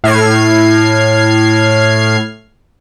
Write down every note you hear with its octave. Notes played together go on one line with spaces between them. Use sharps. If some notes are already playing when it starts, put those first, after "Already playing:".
A2 F6 G#6 C7